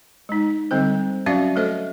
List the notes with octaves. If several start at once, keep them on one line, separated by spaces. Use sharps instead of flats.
G#3 D#4
D3 G3 C4 C5
F#3 C#4 F#4 D5 E5 F5
A3 A4 C5 D#5 E5